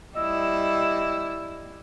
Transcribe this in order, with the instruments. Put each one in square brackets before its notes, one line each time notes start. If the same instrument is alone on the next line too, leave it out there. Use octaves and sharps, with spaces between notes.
[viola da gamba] G3 E4 [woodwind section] D#5 E6